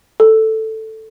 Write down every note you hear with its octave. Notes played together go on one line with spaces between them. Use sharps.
A4